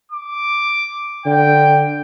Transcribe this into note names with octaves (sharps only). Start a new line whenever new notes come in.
D6
D3 G5